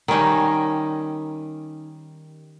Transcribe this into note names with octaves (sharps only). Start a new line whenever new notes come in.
D#3 G3 C#4 D#4